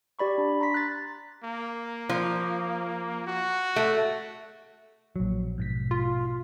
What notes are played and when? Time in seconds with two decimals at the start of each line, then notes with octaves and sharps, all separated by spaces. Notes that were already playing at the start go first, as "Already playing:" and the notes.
0.19 G4 D5 B5 C#6
0.38 D4
0.61 A#5 C6 A#6 B6
0.74 F#6 A6
1.44 A#3
2.09 F3
3.27 F#4
3.76 A3
5.16 A#1 F#3
5.58 G#2 B2 B6
5.91 F4